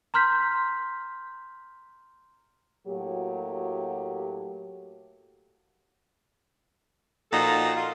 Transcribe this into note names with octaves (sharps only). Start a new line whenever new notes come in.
A#5 C6 F6 G6 B6
A2 F#3 A#3 F#4 G4
A#2 F3 D#4 F#4 A4
F4